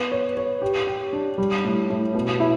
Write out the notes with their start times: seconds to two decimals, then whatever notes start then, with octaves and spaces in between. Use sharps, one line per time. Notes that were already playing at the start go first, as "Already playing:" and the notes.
Already playing: B3
0.11 C#5
0.37 C#5
0.62 G4
0.87 G4
1.13 D4
1.38 G3
1.64 A2
1.90 A2
2.14 B2
2.40 E4